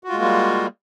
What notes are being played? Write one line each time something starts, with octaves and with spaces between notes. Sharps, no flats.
G3 G#3 A#3 F4 F#4